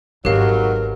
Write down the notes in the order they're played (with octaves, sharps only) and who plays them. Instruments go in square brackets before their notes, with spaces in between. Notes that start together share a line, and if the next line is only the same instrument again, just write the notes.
[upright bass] G#1 [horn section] G#2 B2 F#3 [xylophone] G4 F5 [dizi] A#4